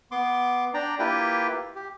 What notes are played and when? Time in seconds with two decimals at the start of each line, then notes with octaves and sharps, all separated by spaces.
0.11 B3 C6 D6
0.74 D4 D5 G5 A#5
0.99 A#3 E4 F4 G4 B4 G5
1.76 G4